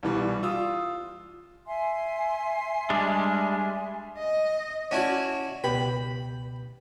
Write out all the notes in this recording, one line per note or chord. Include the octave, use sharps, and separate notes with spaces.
C2 B2 E3 G3
F4 D#6 E6
E5 G#5 C6
G3 G#3 D4
D#5
C#4 E4 F#4 D5 F#5 A5
C#2 B2 G4 B4 G5 B5